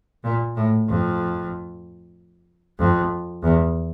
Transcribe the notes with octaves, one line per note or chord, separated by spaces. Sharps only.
A#2
A2
F2
F2
E2